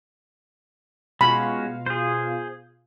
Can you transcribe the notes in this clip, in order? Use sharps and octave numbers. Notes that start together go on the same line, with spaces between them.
B2 G#3 C#4 F4 F#4 F5 B5
G#4 C5